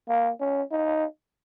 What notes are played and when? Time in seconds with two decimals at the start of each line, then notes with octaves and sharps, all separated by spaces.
0.09 A#3
0.41 C#4
0.72 D#4